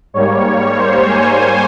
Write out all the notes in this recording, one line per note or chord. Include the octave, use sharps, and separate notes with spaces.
G#2 G3 A#3 C#5
C5
G#5